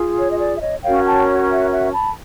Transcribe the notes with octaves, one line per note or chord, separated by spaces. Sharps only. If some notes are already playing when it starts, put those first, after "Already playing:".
Already playing: F4 G#4
C#5
D#5
D5
E5
C#5 D#5
C#4 F#4 A#4 C#5 F5 G5
G5 A5
E5 F#5
E5 F#5
A5 B5